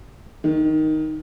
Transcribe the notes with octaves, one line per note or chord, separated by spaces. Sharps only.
D#3